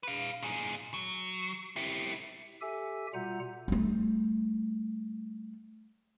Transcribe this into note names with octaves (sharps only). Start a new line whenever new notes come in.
B4 F5
A#2 G#4
F#3
E4 G4
G4 A4 E5 G#5 E6
B2 G3 F4 F#5 A#5 G6
G3 A3